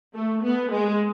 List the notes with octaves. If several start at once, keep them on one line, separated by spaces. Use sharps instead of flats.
A3
B3
G#3